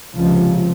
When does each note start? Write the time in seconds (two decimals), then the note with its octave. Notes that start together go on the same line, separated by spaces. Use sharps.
0.16 C#2 C3 F3